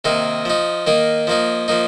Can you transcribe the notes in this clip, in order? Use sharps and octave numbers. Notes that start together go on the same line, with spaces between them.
C3 D#3 A#3 D#4
F3 D#4
D#3 A#3 D#4
F3 A#3 D#4
F3 A#3 D#4